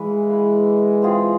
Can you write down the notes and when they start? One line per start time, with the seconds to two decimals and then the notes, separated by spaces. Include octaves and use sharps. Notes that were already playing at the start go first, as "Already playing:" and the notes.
Already playing: E3 G#3 E4 B4 F5
0.29 E4 B4 F5
1.02 C4 F4 G#4